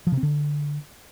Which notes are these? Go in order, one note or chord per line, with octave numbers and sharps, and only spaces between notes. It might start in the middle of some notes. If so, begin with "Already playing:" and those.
F3
C3
C4
D3